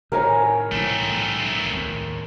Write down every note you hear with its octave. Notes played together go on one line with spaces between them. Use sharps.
A2 D#3 A#4 C#5 G#5
C2 A2 E3 A3 C4
D#2 A2